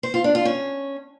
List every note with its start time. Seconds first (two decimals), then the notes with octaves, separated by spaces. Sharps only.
0.03 C5
0.14 F4
0.24 D4
0.35 F4
0.45 C#4